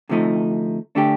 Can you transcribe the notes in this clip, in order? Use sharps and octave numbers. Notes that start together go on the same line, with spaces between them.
D2 C3 F3 A3 D#4
D3 A3 D4 G4